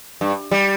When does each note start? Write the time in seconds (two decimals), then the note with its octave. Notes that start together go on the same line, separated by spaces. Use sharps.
0.21 G2
0.51 G3